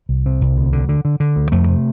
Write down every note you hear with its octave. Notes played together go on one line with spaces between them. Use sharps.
C2
C3
C2
D2
D3
D3
D3
D3
D2
F2 A3
C3